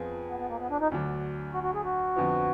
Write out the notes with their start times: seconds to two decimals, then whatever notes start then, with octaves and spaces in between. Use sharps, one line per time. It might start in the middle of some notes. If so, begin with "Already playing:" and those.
Already playing: F2 F3 B3 F4 G#4
0.29 B3
0.39 B3
0.49 A#3
0.60 B3
0.70 D4
0.81 D#4
0.92 D2 D3 F#3 D4
1.53 F#4
1.63 F#4
1.74 G#4
1.85 F#4
2.16 F2 D3 F3 B3